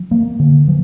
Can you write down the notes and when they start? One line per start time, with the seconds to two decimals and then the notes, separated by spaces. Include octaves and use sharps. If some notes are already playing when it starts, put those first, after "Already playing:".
Already playing: F3
0.11 A#3
0.40 D3
0.68 F3